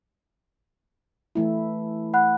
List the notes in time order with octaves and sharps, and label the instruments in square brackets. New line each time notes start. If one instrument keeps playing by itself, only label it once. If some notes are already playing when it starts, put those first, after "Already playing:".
[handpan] E3 A3 E4
[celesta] F#5 B5 F#6